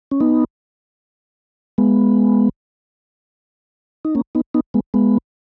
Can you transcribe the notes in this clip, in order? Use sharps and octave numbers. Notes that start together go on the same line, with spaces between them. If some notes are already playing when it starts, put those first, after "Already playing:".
C#4
B3 D#4
G#3 B3
D#4
A#3 C#4
B3 D#4
B3 D#4
G#3 B3
G#3 B3